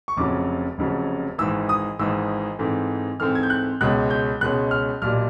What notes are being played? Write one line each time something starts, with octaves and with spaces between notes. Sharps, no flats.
C#6
F1 F2 C#3 F#3 D6
F1 F2 C#3 F#3
G#1 G#2 E3 E6
D#6
G#1 G#2 E3 E6
G#2 E3 A3 C4
G#2 E3 A3 C4 F6
G#6
G6
F#6
C#2 B2 G#3 C#4 F#6
G6
C#2 B2 G#3 C#4 F#6
F6
B1 A#2 G3 F6